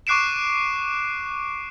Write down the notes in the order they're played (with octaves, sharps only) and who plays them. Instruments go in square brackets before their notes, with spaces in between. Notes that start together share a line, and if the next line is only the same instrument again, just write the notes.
[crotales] C#6 D6 F#6 C7 D7 E7